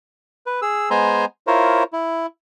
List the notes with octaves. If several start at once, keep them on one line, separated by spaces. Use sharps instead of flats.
B4
G#4 E6
G#3 B3 C5 G#5 A#5 C6
E4 F4 A#4 C5 C#5
E4